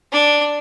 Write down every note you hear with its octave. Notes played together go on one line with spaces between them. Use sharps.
D4